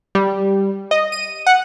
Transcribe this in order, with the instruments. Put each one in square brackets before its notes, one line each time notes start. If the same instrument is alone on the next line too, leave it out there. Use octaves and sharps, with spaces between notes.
[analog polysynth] G3
D#5
D#7
F#5